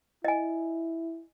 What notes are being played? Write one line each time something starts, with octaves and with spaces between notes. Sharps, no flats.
E4 D#5 G#5